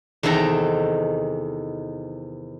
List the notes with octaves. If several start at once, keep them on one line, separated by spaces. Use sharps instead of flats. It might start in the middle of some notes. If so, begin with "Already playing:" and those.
E2 C3 D#3 D#4 A4 A#5